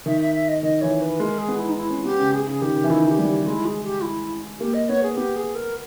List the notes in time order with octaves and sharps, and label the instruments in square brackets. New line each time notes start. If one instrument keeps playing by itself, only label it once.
[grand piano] D#3 [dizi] E5
[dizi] E5
E5
D#5
[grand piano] D#3 [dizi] D#5
[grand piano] E3 [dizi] C#5
[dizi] B4
[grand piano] G#3 [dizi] A#4
[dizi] G#4
[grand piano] B3
[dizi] E4
D#4
E4
[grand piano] C#4
[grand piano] B3 [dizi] G4
[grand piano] C#3
[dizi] G#4
[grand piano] C#3 [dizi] G#4
[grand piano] D#3 [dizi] G4
[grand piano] D#3
E3
[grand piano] D#3 [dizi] E4
[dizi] E4
G4
[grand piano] G3
[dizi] G4
G4
[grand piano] G#3 [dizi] E4
[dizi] G#4
G4
E4
[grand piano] A#3 [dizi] G4
[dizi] D#5
[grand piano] B3 [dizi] C#5
[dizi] G#4
[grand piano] B3 [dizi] G4
[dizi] G#4
A#4